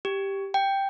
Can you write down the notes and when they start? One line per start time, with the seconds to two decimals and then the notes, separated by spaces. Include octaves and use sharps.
0.05 G4
0.54 G5